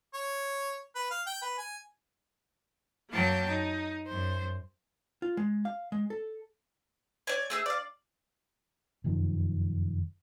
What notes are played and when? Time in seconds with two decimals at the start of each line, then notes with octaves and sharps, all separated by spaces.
0.14 C#5
0.95 B4
1.11 F5
1.27 G5
1.42 B4
1.58 G#5
3.11 F#2 F#3 A#3 G5 A5
3.48 D#4
4.06 F#2 C5
5.22 F4
5.37 G#3
5.65 F5
5.92 G#3
6.10 A4
7.27 C#5 D5 G#5
7.50 A3 G#4 E6
7.66 D5 F5
9.04 F1 F#2 D#3 F3